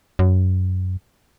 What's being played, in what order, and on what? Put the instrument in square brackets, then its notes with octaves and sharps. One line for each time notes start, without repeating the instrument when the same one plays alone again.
[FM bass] F#2